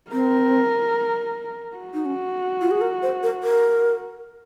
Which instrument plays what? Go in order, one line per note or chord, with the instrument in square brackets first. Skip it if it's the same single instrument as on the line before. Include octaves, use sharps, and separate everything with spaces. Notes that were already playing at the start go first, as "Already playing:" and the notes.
[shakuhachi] C4 [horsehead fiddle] A#4
[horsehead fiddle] F#4
[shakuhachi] D#4
C#4
F4
G#4
A#4
C5
A#4
A#4